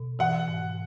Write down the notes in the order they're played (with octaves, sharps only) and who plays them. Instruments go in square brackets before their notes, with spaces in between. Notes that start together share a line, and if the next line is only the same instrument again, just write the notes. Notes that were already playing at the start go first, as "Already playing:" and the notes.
Already playing: [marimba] B2
[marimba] E3 [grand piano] F#5
[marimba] G#2